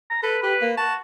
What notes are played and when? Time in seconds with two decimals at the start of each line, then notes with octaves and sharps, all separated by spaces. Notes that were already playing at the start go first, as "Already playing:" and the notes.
0.10 A#5
0.23 A4 B4
0.43 G4 B4
0.61 A#3
0.77 F#4 A5